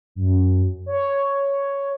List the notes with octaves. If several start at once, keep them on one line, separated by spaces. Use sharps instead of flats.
F#2
C#5